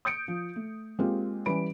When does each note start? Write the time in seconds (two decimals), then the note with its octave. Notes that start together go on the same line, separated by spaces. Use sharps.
0.05 D#6 G6 C#7 D7
0.28 F3
0.56 A3
0.99 G#3 A#3 C4 F4 G4
1.46 E3 G3 C#4 B5 D7